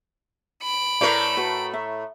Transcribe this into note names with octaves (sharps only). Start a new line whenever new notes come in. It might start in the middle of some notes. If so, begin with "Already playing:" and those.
B5 D7
A2 A3 A#4 B4 D5
F#4 B4
E5